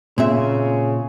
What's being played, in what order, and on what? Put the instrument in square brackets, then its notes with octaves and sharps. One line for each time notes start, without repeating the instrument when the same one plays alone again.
[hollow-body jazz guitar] A#2 C4 E5 [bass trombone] C#3